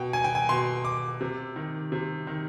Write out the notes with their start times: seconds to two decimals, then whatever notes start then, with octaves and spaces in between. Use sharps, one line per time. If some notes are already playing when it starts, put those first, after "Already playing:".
Already playing: B2 G5
0.13 G#5
0.24 G5
0.35 G#5
0.49 B2 C6
0.85 D6
1.21 C3
1.56 D#3
1.92 C3
2.27 D#3